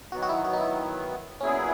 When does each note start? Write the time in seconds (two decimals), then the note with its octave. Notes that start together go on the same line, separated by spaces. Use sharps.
0.12 D#3 F#3 B3 F#4
0.22 F#4
0.29 E4
0.45 F#4
0.53 D#4
0.61 E4
1.41 A#2 F#3 B3 C#4 E4 G#4